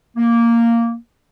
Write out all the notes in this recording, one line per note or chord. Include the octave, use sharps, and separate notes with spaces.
A#3